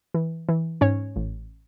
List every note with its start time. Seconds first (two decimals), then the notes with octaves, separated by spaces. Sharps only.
0.14 E3
0.49 E3
0.81 G#2 C#4 C#5
1.16 A1